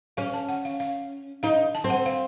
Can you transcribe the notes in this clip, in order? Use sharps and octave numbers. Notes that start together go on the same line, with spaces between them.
C#4 F5
A5
F#5
F5
F5
D#4 F5
A5
C4
F#5
F5